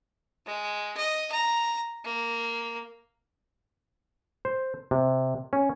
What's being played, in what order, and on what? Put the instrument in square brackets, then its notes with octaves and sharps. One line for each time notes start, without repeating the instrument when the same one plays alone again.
[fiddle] G#3
D#5
A#5
A#3
[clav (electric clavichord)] C5
C3
C#4